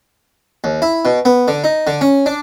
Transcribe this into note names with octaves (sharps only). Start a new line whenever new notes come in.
D#2
E4
B2
B3
D3
D#4
D3
C#4
D4